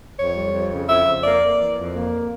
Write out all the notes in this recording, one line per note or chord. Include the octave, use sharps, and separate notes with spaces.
F2 C#5
G3
F2
C#3
F2 E5
F2
A#3 D5
A#3
E3
F2
A#3